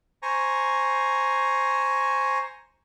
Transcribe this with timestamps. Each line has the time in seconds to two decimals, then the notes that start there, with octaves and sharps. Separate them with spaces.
0.23 C5 G#5 A#5 C#6